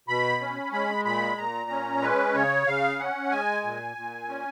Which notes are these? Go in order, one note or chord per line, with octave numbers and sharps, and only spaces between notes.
B2 B5
C#4
G#3 B5
A#2 B5
A#2 A#5
C#4
G#3 B4
C#3 C#5
C#3 F5
C#4 F#5
G#3 G#5
A#2
A#2
C#4